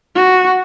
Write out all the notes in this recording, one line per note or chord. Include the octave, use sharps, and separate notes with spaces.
F#4